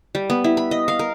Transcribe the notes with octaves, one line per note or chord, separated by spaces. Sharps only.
G3
B3
E4
B5
D#5
F5
A#4